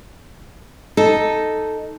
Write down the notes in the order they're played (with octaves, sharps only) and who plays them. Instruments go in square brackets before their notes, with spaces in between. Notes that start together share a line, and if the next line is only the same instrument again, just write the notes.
[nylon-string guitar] D#4 A4